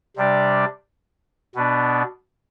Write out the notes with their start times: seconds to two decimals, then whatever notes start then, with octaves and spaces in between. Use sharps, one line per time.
0.16 C3 G3 D4 G4 D5
1.55 B2 B3 D4